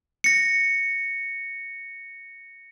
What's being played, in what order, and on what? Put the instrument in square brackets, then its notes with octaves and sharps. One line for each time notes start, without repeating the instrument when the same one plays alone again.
[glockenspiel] A#6 C#7